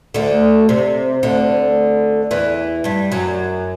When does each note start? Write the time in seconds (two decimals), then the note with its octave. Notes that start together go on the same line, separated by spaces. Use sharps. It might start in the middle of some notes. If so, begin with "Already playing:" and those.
0.14 D2 D3
0.69 C3
1.23 D2 D3
2.31 E2 E3
2.84 G2 G3
3.12 F#2 F#3